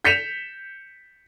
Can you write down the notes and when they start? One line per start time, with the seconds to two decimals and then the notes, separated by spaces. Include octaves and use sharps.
0.04 G6 B6 C#7 E7 F7